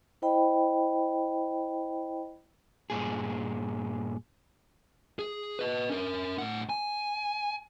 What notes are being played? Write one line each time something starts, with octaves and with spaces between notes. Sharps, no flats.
E4 C5 D#5 G5 B5
G2 A#2 G#4
G#4
B4 D#5
C#4 A#4
A2 F#5
G#5